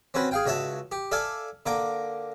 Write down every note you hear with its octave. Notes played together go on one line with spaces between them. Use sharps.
C4 C#4 F#4 B4
G#4 F5 G5
C#2 F#4 C#5 E5 A5
G4
A4 D5 E5 F5 G#5
D3 A#3 A#5 D6